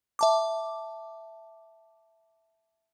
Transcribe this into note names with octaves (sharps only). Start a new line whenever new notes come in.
E5 A5 D6